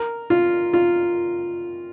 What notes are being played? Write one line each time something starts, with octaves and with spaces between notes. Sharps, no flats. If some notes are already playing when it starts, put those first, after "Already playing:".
Already playing: A#4
F4
F4